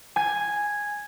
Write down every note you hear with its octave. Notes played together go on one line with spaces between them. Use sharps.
G#5 G#6